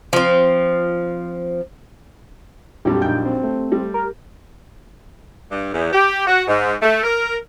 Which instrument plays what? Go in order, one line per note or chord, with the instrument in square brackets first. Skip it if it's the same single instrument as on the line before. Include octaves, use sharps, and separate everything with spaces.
[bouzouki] F3 C4
[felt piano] A#1 F2 [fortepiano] F#3 G3 [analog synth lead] G4
[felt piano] A#1 D#4 G6 [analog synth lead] G5
[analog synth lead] C4
[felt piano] A3
[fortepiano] G3
[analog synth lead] A#4
[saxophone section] G2
E2
G4
F#4
G#2
A3
A#4